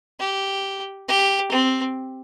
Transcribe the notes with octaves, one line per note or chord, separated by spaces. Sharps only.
G4
G4
C4